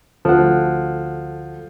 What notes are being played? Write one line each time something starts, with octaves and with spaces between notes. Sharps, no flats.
D2 F3 A4 F#5